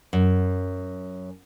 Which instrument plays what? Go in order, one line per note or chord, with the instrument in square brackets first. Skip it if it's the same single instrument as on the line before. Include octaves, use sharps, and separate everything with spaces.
[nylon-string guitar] F#2